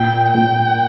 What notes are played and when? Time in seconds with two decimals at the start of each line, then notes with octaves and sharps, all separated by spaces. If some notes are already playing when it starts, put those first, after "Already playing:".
Already playing: A#2 G5
0.34 A#2 G5